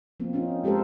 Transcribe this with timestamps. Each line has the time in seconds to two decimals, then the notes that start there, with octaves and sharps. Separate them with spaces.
0.20 F3 A#3 C4
0.33 C4 C#4 D#4 F4
0.64 G#3 G4 A4 A#4 C5